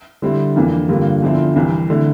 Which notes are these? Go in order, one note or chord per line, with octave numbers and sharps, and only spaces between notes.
D3 G3 C4 E4
F2 E3 A#3 D4
G2 D3 G3 A#3 F4
E2 D3 F3 C4 E4
C2 C3 E3
D3 A3 E4